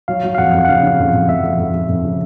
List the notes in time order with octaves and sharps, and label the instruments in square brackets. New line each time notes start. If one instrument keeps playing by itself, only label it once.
[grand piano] F#3 [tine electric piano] F5
[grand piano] F#3
[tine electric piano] F5
[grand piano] F2 [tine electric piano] F#5
[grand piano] F2
[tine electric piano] F#5
[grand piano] C#3 [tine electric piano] F5
[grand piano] C#3
F2
F2
[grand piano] F2 [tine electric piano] E5
[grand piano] F2
F2
F2
F2
C#3